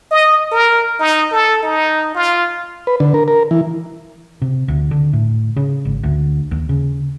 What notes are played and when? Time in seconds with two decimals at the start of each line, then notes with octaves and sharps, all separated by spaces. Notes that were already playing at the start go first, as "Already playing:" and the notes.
0.11 D#5
0.52 A#4
1.00 D#4
1.32 A4
1.63 D#4
2.15 F4
2.87 B4
3.00 D3
3.14 A#4
3.28 A#4
3.51 E3
4.42 C3
4.68 D2
4.91 D3
5.13 A2
5.56 C#3
5.85 G#1
6.03 D2
6.51 D#2
6.69 C#3